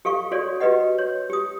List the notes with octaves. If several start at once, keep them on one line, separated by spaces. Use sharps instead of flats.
G4 A4 F5 C#6
F#4 G#4 A4 C#5 D5
F#4 G4 B4 D#5 F#5
C#5
G4 D#6